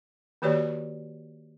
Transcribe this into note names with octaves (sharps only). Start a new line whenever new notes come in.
D#3 A#3 F#4 G4 C#5 D5